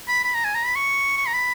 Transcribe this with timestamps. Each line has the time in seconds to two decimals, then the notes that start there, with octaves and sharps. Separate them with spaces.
0.09 B5
0.25 B5
0.35 A#5
0.44 G#5
0.55 A#5
0.66 B5
0.76 C#6
1.17 C#6
1.27 A#5
1.34 B5